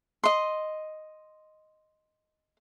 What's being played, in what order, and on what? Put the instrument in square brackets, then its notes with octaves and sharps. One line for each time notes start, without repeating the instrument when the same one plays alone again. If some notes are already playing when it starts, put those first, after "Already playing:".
[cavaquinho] D#5 C6